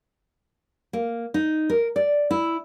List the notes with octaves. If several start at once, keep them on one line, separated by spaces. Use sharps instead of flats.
A#3
D#4
A#4
D5
E4